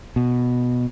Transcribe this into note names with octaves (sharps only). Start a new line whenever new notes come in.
B2